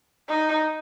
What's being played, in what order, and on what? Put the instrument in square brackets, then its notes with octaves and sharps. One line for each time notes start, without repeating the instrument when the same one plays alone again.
[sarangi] D#4